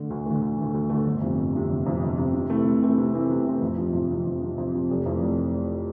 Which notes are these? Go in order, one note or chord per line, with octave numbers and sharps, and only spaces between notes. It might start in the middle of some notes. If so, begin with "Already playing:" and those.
Already playing: D3 A3
D2
D3 A3
D2
D3 A3
D2
D3 A3
G1
F2 C3
G1
F2 C3
G1
F2 C3
G1
F2 C3
C3
E3 A3 C4 E4
C3
E3 A3 C4 E4
C3
E3 A3 C4 E4
C3
E3 A3 C4 E4
F2
C3 F3
F2
C3 F3
F2
C3 F3
F2
C3 F3
F1
F2 E3 A3
F1